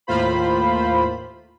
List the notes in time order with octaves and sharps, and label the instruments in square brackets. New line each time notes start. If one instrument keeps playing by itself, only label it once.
[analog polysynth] D#2 A2 A#3 F4 C5 B5